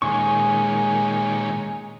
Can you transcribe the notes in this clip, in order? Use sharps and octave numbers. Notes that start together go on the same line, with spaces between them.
A#2 D#3 G#3 C#4 G#5 C#6